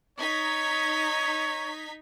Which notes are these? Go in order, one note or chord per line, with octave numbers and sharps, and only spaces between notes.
D#4 C#5 G#6 B6